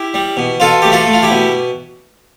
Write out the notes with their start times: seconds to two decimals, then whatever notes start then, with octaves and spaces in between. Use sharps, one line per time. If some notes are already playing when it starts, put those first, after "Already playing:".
Already playing: E4 G4
0.14 G3
0.37 B2
0.60 B2 F4 A4
0.82 A3 G4
0.92 F4 A4
1.07 A3
1.13 F4
1.23 E4 G4
1.31 B2